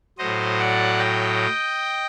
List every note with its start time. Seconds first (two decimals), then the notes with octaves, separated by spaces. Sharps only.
0.18 A2 F#3 C5 D#5
0.59 D5 F#5
0.98 D#5 G5